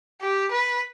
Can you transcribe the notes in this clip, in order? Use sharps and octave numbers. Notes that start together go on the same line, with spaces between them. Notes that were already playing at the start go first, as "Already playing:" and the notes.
G4
B4